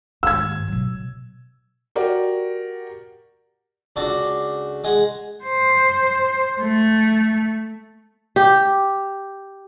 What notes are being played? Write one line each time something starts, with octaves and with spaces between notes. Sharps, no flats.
D#2 G#2 E6 G#6
B2 F#3
F#4 G4 A#4 D5
C#2 D4 F#4 A4
G#3 G#4 F#5
C5
A3
G4